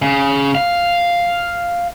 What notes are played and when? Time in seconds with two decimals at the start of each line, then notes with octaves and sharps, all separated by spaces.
0.02 C#3
0.55 F5